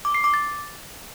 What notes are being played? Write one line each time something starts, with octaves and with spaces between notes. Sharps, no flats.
D6
C7
D6
A6